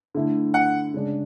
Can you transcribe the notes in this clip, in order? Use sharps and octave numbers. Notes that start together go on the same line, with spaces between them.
D3 A3 E4
F#5
C#3 G#3 D4